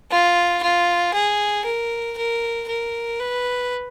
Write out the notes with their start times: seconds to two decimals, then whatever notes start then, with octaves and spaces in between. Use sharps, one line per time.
0.11 F4
0.63 F4
1.14 G#4
1.65 A#4
2.18 A#4
2.69 A#4
3.20 B4